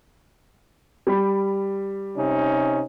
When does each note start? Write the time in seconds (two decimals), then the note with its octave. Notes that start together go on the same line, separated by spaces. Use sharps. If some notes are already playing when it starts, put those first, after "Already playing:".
1.07 G3 B5
2.15 C3 C#4 D#4